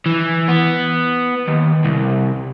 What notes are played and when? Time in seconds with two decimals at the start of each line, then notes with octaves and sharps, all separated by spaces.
0.06 E3
0.49 B3
1.48 D#2
1.85 C2